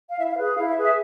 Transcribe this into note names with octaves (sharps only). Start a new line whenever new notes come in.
F5
E4 E5
F5
G#4 B4
E4 F5
E5
G#4 B4
E5